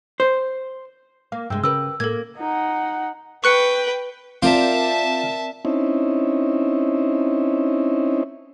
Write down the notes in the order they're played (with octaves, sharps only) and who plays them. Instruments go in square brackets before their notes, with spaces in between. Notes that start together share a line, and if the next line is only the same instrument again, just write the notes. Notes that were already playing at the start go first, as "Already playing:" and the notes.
[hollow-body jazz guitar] C5
[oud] A#3 [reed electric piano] F5
[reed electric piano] G2 G5 E6 [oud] C3 G#3
[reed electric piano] C#3 [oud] G4 A#4 B4 [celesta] E6
[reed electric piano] A2 [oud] A#3 [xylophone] A4 A#4 G#6
[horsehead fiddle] D#4 F#5
[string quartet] B4 G5 [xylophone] C#6 F#6 C#7
[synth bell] C4 A#4 D5 [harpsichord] F4 D6 [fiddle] E5 A5
[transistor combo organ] C4 C#4 D#4 E4